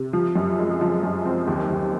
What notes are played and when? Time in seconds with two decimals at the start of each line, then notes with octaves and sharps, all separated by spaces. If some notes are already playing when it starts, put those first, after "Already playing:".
Already playing: C3
0.13 F3
0.36 F#2
0.59 G#3
0.81 F3
1.03 F#2
1.26 C4
1.47 D#2
1.71 D#2